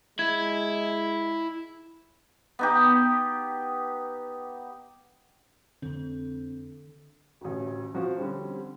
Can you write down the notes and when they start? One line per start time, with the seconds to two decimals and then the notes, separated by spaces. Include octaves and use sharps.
0.19 G#3 E4 G#6
2.59 B3 D#4 G4
5.82 F2 D3 C4
7.41 A1 D2
7.94 F3 F#4
8.16 D3 G3 C4 C#4